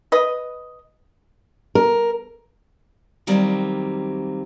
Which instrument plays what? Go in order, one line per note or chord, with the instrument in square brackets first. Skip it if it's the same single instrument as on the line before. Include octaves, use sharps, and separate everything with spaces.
[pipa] B4 D#5
[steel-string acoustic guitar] A#4
D#3 F#3 G3 A#3 C4